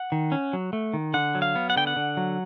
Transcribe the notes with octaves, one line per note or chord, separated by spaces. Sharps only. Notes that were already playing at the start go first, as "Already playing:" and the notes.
Already playing: F#5
D#3
C#4
F#3
A3
D#3
D3 F#5
F#3
F5
B3
F#5
D3 G5
F#5
D3
F#3